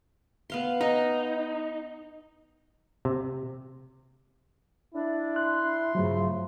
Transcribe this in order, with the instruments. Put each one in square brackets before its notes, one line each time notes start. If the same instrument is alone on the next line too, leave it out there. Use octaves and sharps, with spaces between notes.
[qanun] B3 F5 C6
[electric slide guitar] D#4 [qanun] D#5
[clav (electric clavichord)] C3
[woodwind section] D4 [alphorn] E4
[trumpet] C6 [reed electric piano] F#6
[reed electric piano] G2 F#3 [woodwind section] C#3 A3 [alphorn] F3